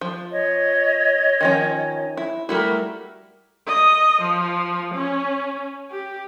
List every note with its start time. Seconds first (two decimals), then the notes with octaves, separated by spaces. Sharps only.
0.01 F3
0.31 C#5 D#5
1.41 D#3 F3 C#4
2.17 E4
2.49 G3 A3 E4 F#4 A#4 B5
3.67 D#5
4.22 F3
4.94 C#4
5.91 G4